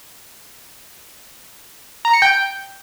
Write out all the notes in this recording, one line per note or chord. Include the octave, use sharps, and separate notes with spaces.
A#5
C#7
G5